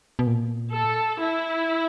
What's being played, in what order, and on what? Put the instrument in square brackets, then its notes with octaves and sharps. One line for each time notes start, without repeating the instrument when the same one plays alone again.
[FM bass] B2
A#2
[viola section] A4
E4